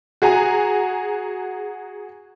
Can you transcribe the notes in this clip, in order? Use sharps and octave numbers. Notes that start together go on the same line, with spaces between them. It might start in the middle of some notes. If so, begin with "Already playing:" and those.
F#4 G#4 G#5 A#5